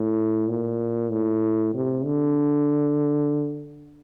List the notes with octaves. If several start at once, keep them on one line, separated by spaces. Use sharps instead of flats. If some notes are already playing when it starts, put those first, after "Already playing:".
Already playing: A2
A#2
A2
C3
D3